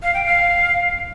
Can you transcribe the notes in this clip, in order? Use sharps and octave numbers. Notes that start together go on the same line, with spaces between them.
F5
G5
F5